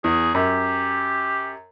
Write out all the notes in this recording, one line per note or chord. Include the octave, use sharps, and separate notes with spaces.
E2 G#4
F#2 G4